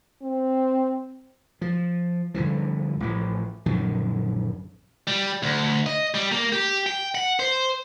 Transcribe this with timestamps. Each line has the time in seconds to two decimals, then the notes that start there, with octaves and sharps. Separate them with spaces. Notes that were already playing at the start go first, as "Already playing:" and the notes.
0.22 C4
1.61 F3
2.34 G2 D3 E3 F3
3.00 A1 A2 F3
3.66 A#1 F#2 D3 D#3
5.07 G3
5.43 D2
5.86 D#5
6.14 G3
6.32 A#3
6.52 G4
6.87 G5
7.15 F#5
7.40 C5